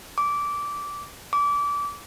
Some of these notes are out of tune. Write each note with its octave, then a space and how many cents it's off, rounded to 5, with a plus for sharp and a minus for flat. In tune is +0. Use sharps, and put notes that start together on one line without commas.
D6 -15
D6 -25